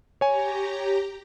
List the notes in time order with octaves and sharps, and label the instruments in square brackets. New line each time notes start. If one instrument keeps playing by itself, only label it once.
[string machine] G4 A#5 [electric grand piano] C#5 G#5